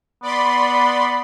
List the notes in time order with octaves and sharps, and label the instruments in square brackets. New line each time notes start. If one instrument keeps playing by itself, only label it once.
[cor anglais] B3 [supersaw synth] D5 B5 C6